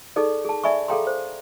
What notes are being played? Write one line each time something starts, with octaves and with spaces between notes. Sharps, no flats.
D#4 G#4 A4 D5
G#4 A5
D5 E5 G#5 B5 C#6
G#4 A4 F5 G5 A#5 C6
C5